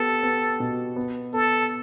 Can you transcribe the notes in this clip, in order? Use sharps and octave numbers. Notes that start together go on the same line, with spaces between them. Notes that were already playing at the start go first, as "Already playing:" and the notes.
Already playing: B3 G4 A4
B3
B2
B3
B3 A4